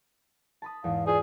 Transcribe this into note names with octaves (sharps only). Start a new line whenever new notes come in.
A5 B5 D#6
E2 G#2 F5
F4 G#4 B4 C5 D5